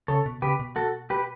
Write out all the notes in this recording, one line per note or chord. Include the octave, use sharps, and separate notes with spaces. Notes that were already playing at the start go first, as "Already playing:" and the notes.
C#3 A4 C#5
B2
C#3 G4 B4
B2
F#4 A4
G4 B4